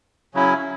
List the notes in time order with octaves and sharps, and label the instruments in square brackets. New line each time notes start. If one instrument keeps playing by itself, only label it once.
[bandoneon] C#3 F#3 C#4 E4